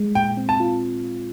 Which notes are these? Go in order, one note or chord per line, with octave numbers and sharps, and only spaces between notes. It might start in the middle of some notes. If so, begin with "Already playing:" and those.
Already playing: G#3
A#2 G5
C4
A5
F4